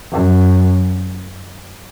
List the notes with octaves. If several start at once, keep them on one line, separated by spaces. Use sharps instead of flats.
F#2